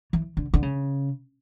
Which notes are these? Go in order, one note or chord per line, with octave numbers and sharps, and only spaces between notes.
E3
D3
D3
C#3